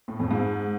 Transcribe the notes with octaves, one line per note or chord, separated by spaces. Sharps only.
A2
F2
G#2